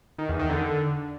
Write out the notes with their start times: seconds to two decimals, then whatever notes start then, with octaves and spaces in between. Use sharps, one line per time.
0.19 D#3
0.29 E2
0.39 D#3
0.50 D3